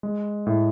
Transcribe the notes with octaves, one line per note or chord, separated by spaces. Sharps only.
G#3
A2